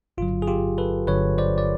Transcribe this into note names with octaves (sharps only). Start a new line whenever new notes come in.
G1 G2 D3 F#3 F4
G#4
F4 G4
A4 B4
G1 G2 D3 F#3 B4 C#5
C5 D5
D5